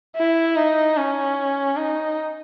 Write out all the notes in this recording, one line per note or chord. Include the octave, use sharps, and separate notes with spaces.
E4
D#4
C#4
D#4